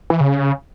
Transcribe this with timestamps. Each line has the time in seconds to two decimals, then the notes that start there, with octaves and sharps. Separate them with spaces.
0.10 E3
0.20 C#3